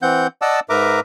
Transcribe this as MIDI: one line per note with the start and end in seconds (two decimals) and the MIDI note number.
0.02 0.27 52
0.02 0.27 60
0.02 0.27 78
0.02 0.27 91
0.42 0.60 74
0.42 0.60 75
0.42 0.60 78
0.42 0.60 81
0.42 0.60 86
0.42 0.60 88
0.69 1.00 44
0.69 1.00 70
0.69 1.00 71
0.69 1.00 76
0.69 1.00 82
0.69 1.00 86